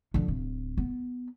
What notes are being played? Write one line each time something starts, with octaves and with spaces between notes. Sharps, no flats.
D3 F3
D1
B3